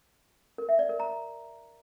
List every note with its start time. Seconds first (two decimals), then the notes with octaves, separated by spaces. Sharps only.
0.58 A#4
0.69 E5
0.79 D5
0.89 A#4
1.00 A#5